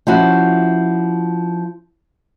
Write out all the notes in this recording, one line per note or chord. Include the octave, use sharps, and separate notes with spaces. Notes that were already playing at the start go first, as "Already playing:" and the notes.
F3 C#4 E4 F#4